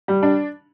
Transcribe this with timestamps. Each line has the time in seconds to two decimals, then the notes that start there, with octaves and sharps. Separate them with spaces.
0.08 G3
0.23 D4